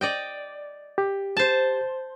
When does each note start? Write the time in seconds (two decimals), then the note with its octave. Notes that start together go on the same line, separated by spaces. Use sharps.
0.01 D5 D#5 G5
0.98 G4
1.37 C5 A5